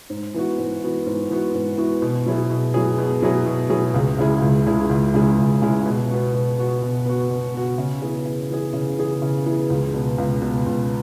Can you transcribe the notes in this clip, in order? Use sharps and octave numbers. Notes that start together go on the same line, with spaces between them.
G#2
E3 B3 F#4
G#2
E3 B3 F#4
G#2
E3 B3 F#4
G#2
E3 B3 F#4
B2
F#3 E4 G#4
B2
F#3 E4 G#4
B2
F#3 E4 G#4
B2
F#3 E4 G#4
C#2
C#3 G#3 E4 G#4
C#2
C#3 G#3 E4 G#4
C#2
C#3 G#3 E4 G#4
C#2
C#3 G#3 E4 G#4
B2
B3 F#4
B2
B3 F#4
B2
B3 F#4
B2
B3 F#4
C#3
E3 B3 G#4
C#3
E3 B3 G#4
C#3
E3 B3 G#4
C#3
E3 B3 G#4
C#2
B2 B3
C#2
B2 B3
C#2